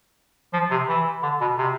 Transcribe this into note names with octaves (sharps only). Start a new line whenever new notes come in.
F3
C3
E3
D3
B2
C3